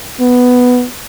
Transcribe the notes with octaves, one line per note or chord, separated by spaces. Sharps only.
B3